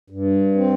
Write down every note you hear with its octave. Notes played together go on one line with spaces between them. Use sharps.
G2
C4